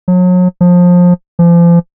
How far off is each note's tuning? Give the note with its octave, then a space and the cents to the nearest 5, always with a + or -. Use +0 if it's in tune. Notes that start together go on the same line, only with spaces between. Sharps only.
F#3 -35
F3 +25
F3 -35